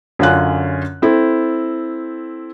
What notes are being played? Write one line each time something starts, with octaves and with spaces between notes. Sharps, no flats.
F#2 D3 C#4 F4 F#6
C4 E4 A4